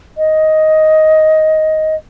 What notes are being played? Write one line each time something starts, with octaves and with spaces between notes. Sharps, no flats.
D#5